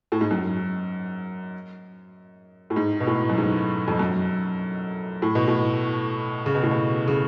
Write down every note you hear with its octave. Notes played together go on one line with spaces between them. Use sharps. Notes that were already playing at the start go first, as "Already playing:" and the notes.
A2
G#2
F#2
A2
G#2
B2
A2
F#2
G#2
F2
F#2
A2
B2
A2
C#3
B2
A2
B2
C#3